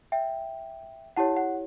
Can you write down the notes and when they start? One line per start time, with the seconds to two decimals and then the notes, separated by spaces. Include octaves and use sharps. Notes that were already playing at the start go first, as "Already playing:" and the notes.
0.12 E5 G5
1.17 E4 G4 C#5 F#5 A5
1.37 F#5